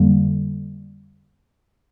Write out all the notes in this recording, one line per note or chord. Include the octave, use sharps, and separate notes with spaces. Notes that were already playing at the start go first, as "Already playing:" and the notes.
Already playing: F2 D3 G3 A#3